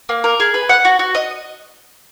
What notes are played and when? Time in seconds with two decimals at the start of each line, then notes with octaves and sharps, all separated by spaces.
0.09 A#3
0.24 A#4
0.40 G#4
0.54 B4
0.69 F#5
0.85 F#4
0.99 F#4
1.15 D#5